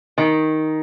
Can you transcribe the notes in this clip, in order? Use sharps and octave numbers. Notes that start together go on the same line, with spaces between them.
D#3